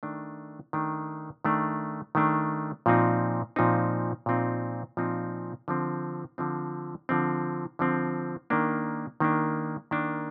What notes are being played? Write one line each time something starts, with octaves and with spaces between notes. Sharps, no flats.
D#3 A3 D4
D#3 A3 D4
D#3 A3 D4
D#3 A3 D4
A#2 F3 C4 D#4
A#2 F3 C4 D#4
A#2 F3 C4 D#4
A#2 F3 C4 D#4
D3 F3 C4
D3 F3 C4
D3 F3 C4
D3 F3 C4
D#3 A#3 D4
D#3 A#3 D4
D#3 A#3 D4